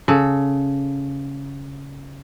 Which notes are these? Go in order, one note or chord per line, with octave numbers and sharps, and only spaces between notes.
C#3 A4